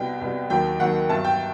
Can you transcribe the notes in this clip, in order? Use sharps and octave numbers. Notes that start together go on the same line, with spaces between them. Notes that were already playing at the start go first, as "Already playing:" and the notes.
Already playing: C2 B2 G3 G5
C2 B2 G3
D#2 D#3 F#3 G5
D#2 D#3 F#3 F#5
G1 G2 F#3 A5
G5